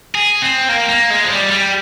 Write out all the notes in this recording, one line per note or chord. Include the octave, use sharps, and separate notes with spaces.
G#4
C4
A#3
A#3
G#3
F3
G3
G3